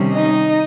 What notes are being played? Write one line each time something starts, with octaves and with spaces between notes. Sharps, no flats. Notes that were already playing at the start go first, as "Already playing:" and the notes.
Already playing: C3 D#3 G3 C#4
D#4 D#5